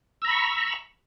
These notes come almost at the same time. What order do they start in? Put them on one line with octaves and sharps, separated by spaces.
E6 A#5 B5 C#6